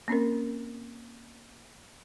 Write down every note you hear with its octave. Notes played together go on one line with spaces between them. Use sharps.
A#3 C4 C#4 A#4